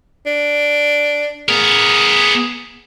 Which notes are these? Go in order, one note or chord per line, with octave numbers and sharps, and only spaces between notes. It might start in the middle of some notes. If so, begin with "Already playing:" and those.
D4
B3 G#4 A#4